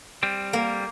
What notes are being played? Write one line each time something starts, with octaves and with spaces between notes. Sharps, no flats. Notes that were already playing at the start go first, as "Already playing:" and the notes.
G3 C4
A#3